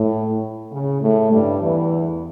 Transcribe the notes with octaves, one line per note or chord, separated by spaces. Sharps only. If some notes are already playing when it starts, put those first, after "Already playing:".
Already playing: A2
C#3
A2 A3
G2 G3
E2 E3